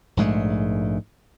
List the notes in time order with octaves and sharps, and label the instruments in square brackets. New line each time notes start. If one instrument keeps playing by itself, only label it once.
[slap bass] A#1 G#2 G#3 A3